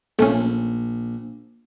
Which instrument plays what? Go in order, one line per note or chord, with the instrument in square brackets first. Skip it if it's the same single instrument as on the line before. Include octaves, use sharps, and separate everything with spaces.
[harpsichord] A#1 [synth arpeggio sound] A3 C#4